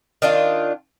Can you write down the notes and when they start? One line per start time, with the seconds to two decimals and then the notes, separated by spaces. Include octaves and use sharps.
0.22 D#3 D4 F4